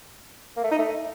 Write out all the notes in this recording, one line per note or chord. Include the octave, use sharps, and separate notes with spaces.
A#3
A3
D#4
A3